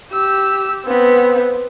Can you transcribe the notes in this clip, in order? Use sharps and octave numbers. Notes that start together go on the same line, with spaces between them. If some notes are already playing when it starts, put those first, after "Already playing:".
G4 E6
B3 C4